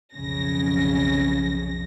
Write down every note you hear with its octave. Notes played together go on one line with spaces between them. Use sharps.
B1 F2 C#3 A#6